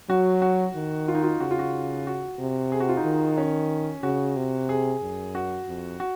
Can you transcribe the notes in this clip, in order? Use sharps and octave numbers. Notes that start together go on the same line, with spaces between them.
F#3 F#4
F#4
D#3
F4
D#4
F4
C#3 F#4
F4
F#4
F#4
C3
G#4
F#4
F4
D#4
D#3
C#4
C#3 F#4
C3
G#4
F#2
F#4
F2
F#4